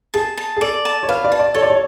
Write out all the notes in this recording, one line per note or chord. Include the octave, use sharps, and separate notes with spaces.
G#4 A5
A5
G#4
A4 D5
A5
C#5
B4 F5
D5
A5
D5
A4 C#5
D5
C#5